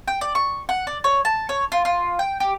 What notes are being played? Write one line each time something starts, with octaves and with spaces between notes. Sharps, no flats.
G5
D5
C#6
F#5
D5
C#5
A5
C#5
F4
F4
G5
G4